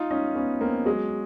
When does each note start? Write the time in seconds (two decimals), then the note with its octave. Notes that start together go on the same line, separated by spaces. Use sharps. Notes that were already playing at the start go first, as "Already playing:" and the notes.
Already playing: D#4 F4
0.11 C#4 D#4
0.35 B3 C#4
0.61 A#3 C4
0.86 F#3 G#3